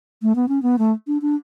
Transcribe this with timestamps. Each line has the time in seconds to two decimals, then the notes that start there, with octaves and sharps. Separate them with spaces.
0.22 A3
0.36 B3
0.48 C#4
0.63 B3
0.79 A3
1.07 D4
1.22 D4